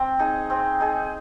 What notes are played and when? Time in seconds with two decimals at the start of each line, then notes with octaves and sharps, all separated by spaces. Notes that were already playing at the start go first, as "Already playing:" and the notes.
Already playing: C4
0.19 D#4 G#4
0.50 C4
0.80 D#4 G#4